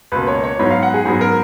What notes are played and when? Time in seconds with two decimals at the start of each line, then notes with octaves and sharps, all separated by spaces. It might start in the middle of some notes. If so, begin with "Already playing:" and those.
0.12 C#2 B2 A#3 B4
0.27 C#5
0.44 C#5
0.59 G#2 F#3 B3 C#5
0.70 F5
0.83 F#5
0.94 G#4
1.05 G#2 F#3 B3 G#4
1.21 A#4